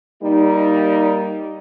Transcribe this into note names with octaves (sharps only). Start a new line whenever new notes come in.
G3 A#3 D#4